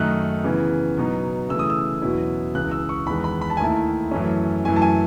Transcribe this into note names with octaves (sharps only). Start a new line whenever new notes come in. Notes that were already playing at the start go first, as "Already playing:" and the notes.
Already playing: F#2 D#3 A3 D#4 F#6
C#3 E3 B3
B2 F#3 B3 D#4
C#3 E3 A3 E6
D#6
E6
E2 B2 F#3 C#4 E4
C#2 C#3 E3 F#6
E6
C#6
E2 D#3 G#3 B5
B5
B5
A5
G#5
D#2 D#3 A3 E4 A5
F#2 E3 A3 C#4
F#2 E3 A3 E4 G#5
A5
G#5